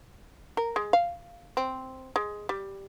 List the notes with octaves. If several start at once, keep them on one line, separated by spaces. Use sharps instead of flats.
A#4
G#3
F5
C4
G#3
G3